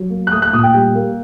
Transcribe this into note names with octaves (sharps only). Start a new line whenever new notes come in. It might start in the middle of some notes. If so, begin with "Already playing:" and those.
Already playing: F#3
A#3
F#6
A3 D#6
F#6
A#2 D#6
G5
G3
A#3